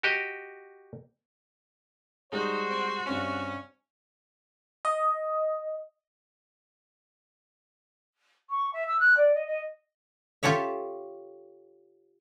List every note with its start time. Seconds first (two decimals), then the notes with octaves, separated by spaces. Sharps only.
0.03 F#4 G4 D#5
2.32 G3 G#3 D#4 F#4 C5
2.70 C4
3.06 G2 C4 C#4 C#7
4.85 D#5
8.49 C#6
8.73 E5
8.88 E6
9.00 F#6
9.17 D5
9.34 D#5
9.47 D#5
10.43 F4 G4 A4 C#5 E5